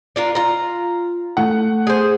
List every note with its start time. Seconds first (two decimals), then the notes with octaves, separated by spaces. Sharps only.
0.16 D4 F4 A#4
0.35 F4 A#5
1.37 A3 F#5
1.87 G#4 C5